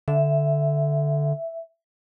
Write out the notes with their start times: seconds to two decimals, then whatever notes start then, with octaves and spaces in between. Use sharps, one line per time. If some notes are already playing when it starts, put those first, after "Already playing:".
0.08 D3 E5